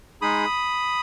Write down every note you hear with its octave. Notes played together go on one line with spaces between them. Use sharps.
G#3 D#4 G#4 B5 D#6